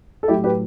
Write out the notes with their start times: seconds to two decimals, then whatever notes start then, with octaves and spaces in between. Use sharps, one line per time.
0.23 A4
0.28 A2 F#3 A3 E4 G4
0.44 G4 B4